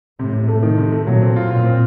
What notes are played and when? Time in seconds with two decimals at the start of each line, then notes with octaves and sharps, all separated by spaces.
0.19 A2 C3
0.33 C3
0.48 A3
0.63 D#3
0.78 C3
0.92 A3
1.06 A#2 F#3
1.22 C4
1.36 F4
1.51 A#2 F4
1.65 C4